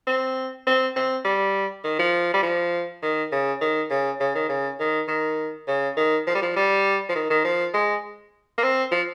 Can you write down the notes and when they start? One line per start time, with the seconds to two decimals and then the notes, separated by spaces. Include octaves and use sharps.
0.07 C4
0.67 C4
0.96 C4
1.24 G3
1.84 D#3
1.99 F3
2.34 G3
2.43 F3
3.03 D#3
3.32 C#3
3.61 D#3
3.90 C#3
4.20 C#3
4.35 D#3
4.49 C#3
4.80 D#3
5.08 D#3
5.68 C#3
5.97 D#3
6.27 F3
6.35 G3
6.42 F3
6.56 G3
7.09 F3
7.15 D#3
7.30 D#3
7.45 F3
7.74 G#3
8.58 A#3
8.63 C4
8.91 F3